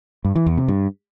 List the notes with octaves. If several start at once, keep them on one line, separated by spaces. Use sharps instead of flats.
G2
E3
E2
C3
G2